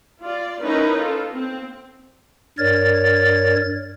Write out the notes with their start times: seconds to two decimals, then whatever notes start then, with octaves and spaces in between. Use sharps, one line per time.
0.21 F4 D5
0.62 C#4 D#4 E4 A#4 B4
0.98 F4 A4
1.32 C4
2.58 G2 A#4 C#5 D5 A6